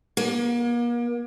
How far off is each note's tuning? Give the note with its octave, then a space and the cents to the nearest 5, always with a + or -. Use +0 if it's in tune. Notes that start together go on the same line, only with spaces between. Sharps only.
A#3 +40